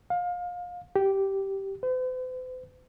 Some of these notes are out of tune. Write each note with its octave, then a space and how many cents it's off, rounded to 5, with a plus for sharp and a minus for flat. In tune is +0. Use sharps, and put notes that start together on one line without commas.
F5 +30
G4 -10
C5 -45